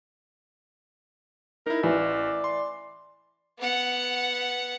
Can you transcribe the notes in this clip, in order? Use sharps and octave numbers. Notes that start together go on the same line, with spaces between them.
D#4 E4 A#4
A1 E3 D5
C6
B3 F#5